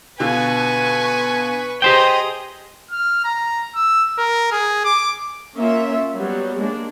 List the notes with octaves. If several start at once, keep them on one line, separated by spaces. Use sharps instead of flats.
B2 D3 F4 B4 G#5 C#6
G4 G#4 C5 D#5 G5 A#5
F6
A#5
E6
A#4
G#4
D6
A#3 C#4 F4 E5
F#3 G3 B3
G#3 A#3 D4